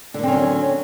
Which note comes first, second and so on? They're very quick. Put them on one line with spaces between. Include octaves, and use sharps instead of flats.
D3 A#3 C4 C#4 F#3